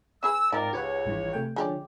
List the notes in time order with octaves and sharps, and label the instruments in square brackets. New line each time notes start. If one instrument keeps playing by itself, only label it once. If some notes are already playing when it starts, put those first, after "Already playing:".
[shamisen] C#4 G#4 B4 [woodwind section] E6
[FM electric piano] G#2 [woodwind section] C4 A#4 D5 [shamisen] D#4 F4
[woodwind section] C#2 C#5 [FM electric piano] G4 B4 F#5
[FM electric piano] G#1 G2 E3
C3 A3 G5
[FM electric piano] D3 F3 C#4 [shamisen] G#3 G4 D5